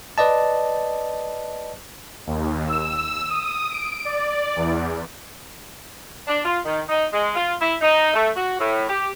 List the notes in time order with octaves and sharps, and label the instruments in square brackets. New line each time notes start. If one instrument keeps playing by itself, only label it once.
[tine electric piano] B4 D5 D#5 A5
[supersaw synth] D#2
E6
D#6
D7
D5
E2
[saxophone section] D4
F4
D#3
D#4
G#3
F4
E4
D#4
A3
F#4
A2
G4